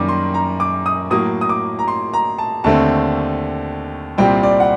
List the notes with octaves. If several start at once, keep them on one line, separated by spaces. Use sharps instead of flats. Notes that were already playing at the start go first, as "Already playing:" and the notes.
Already playing: F#2 D#3 G3 A#3 D6
C6
A#5
D6
D#6
A2 F#3 A#3 D#6
D#6
D6
A#5
C6
A#5
A5
D#2 D3 A3 C4 A5
C2 A#2 G3 C4 G5
D5
F#5